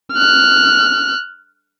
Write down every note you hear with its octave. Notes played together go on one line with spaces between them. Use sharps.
F6 F#6